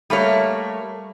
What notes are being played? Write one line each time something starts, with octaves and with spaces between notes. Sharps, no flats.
G3 A3 A#3 C#5